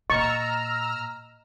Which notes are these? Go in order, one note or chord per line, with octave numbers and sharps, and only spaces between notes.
A#2 D#5 A#5 C#6 E6 F6